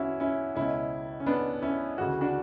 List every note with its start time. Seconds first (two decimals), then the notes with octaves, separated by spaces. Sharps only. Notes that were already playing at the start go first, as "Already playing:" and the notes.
Already playing: E2 D3 C#4 E4 F#4
0.20 C#4 E4
0.56 C#2 B2 C#4 E4
1.20 C#4
1.26 B3 D4
1.62 C#4 E4
1.98 D2 C#3 E3 F#4
2.21 D4 F#4